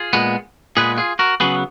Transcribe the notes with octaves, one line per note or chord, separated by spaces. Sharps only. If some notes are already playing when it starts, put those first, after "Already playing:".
Already playing: F4 G#4
A#2 G#3 B3
A#2 G#3 B3 G#4 B4
F4 G#4
F#4 A#4
C#3 F#3 B3 G#4 B4